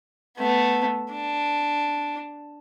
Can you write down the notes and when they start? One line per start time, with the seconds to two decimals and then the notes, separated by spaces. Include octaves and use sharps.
0.38 A3 B3
1.12 D4